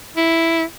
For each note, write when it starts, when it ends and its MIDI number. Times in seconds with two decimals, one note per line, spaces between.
0.17 0.64 64